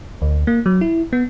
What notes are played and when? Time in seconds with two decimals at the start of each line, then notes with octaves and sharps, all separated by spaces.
0.22 D2
0.47 A#3
0.66 F#3
0.81 E4
1.13 B3